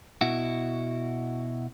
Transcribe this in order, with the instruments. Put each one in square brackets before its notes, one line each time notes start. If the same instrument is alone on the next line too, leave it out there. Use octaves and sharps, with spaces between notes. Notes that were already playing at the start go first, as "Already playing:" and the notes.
[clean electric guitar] B2 E4 F#4